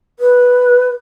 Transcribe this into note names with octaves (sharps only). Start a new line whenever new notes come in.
B4